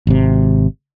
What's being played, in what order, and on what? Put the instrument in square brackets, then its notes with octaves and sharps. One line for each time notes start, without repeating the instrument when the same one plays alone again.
[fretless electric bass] G#1 C3